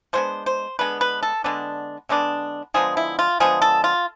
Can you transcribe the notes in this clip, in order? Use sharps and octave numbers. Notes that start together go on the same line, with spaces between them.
D3 G#3 B3 D4 C5
C5
D3 G#3 B3 D4 B4
B4
A4
D3 G#3 B3 D4
D3 G#3 B3 D4
D3 F3 G#3 B3 G#4
E4
F4
D3 F3 G#3 B3 G#4
A4
F4